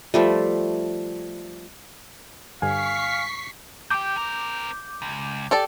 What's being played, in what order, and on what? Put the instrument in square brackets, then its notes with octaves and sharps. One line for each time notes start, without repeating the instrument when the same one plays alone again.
[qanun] F3 G3 A3
[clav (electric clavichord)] G2 D3 [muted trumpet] F5 [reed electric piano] G#5 [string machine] C#6 B6 C7
[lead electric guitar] D2 G4 [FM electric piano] D6 G6
[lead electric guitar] C4 A#4
C#2
[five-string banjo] G4 A4 D5